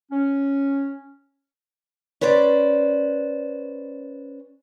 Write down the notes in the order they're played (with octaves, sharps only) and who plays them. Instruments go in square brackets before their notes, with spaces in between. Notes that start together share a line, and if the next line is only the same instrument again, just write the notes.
[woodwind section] C#4
[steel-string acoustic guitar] C#4 B4 C5 D5